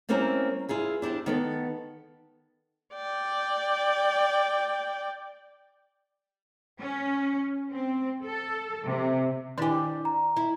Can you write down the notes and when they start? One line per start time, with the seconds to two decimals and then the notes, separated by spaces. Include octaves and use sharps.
0.09 G3 A#3 C4 C#4 E4 A#4
0.69 E4 F4 G#4 B4
1.02 D4 E4 G4 C5
1.26 D#3 B3 A4
2.94 D5 G5
6.80 C#4
7.72 C4
8.24 A4
8.86 C3
9.58 D#3 D4 E4 G4 G#5
10.05 A#5
10.36 E4